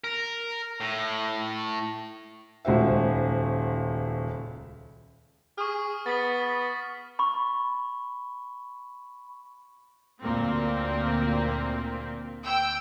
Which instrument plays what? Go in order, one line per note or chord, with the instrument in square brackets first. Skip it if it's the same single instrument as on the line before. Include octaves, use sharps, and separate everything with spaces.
[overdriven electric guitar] A#4
A2
[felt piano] D#1 C#2 F#4 C5 E5
[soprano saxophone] G#4 [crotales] C#6 D#6 F6
[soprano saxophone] B3 [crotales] A6 B6
[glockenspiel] B5 C#6
[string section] D2 A#2 A#3 C4
G5 E6